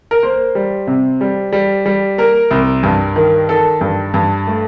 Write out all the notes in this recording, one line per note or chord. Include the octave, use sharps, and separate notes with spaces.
A#4
A#3 C5
G3
C3
G3
G3
G3
A#3 A#4
C2
G2
D#3
D#3 A4
G2
G2
A3